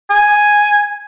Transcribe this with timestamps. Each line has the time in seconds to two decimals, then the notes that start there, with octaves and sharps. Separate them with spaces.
0.10 G#5